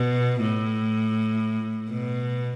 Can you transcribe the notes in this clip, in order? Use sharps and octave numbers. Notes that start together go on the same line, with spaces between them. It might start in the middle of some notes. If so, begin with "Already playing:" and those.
Already playing: B2
A2
B2